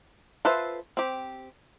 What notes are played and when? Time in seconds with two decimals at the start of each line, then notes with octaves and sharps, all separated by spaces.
0.45 F4 A4 B4 C5 E5
0.97 C4 G4